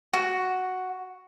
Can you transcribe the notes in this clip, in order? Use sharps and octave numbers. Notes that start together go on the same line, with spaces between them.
F#4